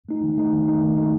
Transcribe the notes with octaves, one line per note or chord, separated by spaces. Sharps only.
A3 D#4
D#3
A3 D#4
D#3
A3 D#4
D#3
A3 D#4